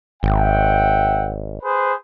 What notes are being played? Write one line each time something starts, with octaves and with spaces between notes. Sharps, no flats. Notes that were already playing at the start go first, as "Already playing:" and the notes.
G#1 E5 F#5 G5
G#4 B4 C5